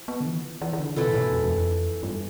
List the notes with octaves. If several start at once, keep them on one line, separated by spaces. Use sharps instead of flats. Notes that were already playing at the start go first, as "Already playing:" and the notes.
Already playing: F3 E4
B3
D3
E3
E3
E3
D3
C3 E3 A3 E4 A4
A2
B2
E2
E2
F2
G2